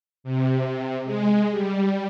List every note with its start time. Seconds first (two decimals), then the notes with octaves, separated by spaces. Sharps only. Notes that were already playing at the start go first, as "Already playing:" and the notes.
0.24 C3
1.05 G#3
1.50 G3